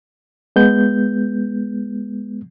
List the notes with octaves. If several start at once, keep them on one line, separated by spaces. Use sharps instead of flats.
G#3 B3 G6